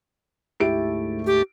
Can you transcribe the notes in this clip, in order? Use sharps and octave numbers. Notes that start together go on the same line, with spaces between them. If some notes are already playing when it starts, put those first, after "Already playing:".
D2 G#2 A3 E4 G4 D7
G4